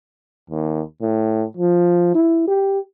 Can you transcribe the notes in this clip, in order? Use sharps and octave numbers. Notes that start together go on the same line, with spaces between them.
D#2
A2
F3
E4
G4